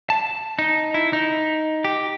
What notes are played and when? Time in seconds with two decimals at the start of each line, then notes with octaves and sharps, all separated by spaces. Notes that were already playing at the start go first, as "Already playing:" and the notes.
0.10 A5
0.59 D#4
0.94 E4
1.13 D#4
1.84 G4